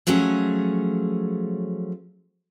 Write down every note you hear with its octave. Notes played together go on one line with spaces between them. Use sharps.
F3 F#3 A3 C#4 G#4